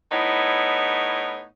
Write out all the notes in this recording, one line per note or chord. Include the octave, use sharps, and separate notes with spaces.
A2 B3 D#4 E4 C#5